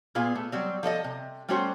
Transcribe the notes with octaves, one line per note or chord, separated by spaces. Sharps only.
A#2 B3 F4 G#4
A3
F#3 G3 C4
F3 A4 D5 D#5
C3
G3 A3 C#4 F#4 C5